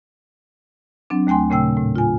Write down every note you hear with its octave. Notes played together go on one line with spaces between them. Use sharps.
F#3 C4 D4
D#2 A3 G5 G#5 C6
A#2 C#3 A3 G5 E6
A2
F4 G#5